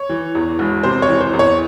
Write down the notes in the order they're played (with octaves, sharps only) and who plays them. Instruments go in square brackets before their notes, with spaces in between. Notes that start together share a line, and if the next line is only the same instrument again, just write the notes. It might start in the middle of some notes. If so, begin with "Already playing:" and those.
Already playing: [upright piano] C#5
E3
E2
E1
C3 C5
C#5
E3
C5
E2
C#5